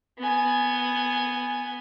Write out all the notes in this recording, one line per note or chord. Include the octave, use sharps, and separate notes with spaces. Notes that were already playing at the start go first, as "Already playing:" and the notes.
B3 G#5